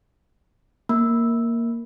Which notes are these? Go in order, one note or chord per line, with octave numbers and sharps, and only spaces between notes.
A#3